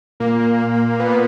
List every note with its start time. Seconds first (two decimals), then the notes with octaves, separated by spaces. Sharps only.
0.20 A#2 A#3
0.40 A#2
0.60 A#2
0.80 A#2
1.00 A#2 B3